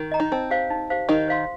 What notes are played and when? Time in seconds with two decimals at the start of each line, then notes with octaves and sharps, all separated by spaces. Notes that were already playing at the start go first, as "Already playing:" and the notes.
Already playing: D#3
0.12 D#5 A#5
0.20 D#4
0.32 C4 D#4
0.51 G4 C5 F5
0.70 D#4
0.90 G4 C5 F5
1.09 D#3 D#4 G4
1.28 C5 F5 C6